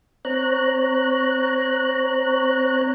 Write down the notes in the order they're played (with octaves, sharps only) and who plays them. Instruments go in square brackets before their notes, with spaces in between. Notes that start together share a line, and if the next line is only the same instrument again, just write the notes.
[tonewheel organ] C4 C#5 A#5 F#6